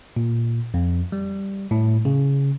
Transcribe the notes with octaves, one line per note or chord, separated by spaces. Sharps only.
A#2
F2
G3
A2
C#3